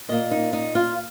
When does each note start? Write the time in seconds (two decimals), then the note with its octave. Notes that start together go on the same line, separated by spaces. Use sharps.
0.09 A#2 A#3 D#5
0.31 D#4
0.53 D#4
0.75 F4